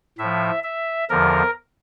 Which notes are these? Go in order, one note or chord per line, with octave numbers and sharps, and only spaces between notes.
A2 F3 E5
E5
E2 D3 F3 A#4